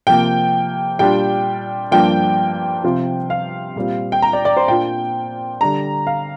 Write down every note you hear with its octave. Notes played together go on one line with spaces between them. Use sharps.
C3 F3 A#3 G5
A#2 G3 D4 F4 G5
G2 F3 A#3 D4 F4 G5
C3 F3 C4 F4
F5
A#2 G3 C4
G5
A#5
D5
D5
C5
A#2 A#3 D4 F4 G5
D3 G3 D4 A#5
F5